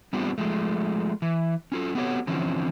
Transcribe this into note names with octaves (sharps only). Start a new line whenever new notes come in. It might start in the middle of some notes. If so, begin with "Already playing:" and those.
G3 B3 C4 D4 F4 G4
F3 G#3 A3
E3
C#4 F4 A4
B3 C4 F#4 G4 A4 C#5
D3 E3 F3 C4 C#4